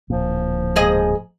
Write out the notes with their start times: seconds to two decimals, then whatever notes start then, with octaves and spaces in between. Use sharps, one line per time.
0.10 D1 A#2 F3
0.76 G#2 G#4 D#5